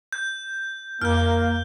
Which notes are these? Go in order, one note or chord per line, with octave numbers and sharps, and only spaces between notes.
G6
F2 A#3 F6 G6